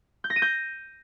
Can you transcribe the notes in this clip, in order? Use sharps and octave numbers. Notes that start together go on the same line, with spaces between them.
G6
A#6
D#7
G6